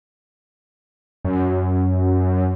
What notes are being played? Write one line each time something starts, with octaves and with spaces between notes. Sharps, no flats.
F#2